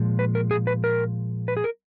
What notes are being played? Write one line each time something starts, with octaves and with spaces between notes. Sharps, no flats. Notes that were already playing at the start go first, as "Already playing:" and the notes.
Already playing: A#2 F3 G#3
B4
A#4
G#4
B4
A#4
B4
G#4
A#4